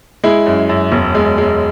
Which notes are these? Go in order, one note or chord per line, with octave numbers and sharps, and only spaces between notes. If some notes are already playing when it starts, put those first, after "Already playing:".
G#3 E4
F#2
F#2
E1
G#3
G#3